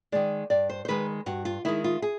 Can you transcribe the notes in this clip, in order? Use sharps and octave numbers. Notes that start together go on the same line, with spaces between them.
D#3 G#3 D5
G2 D5
C5
C5
D#3 G#3 B4
G2 F#4
F4
D#3 G#3 E4
F4
G#4